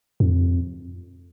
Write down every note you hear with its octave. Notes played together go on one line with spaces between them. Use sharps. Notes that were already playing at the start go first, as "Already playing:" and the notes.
F2